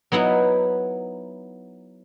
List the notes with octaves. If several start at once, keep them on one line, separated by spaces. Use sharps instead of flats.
F#3 B3 D#4 E4